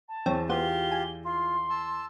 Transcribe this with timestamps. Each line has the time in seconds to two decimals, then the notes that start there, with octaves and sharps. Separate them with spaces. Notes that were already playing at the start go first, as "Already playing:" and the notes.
0.08 A5
0.26 E2 C4 C#5
0.49 B3 F4 G4 C5 G7
0.92 G#5
1.25 F4 C6
1.70 A5 E6